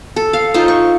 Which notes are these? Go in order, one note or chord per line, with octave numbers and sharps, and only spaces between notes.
A4
F5
D#4 F4 C5
C#6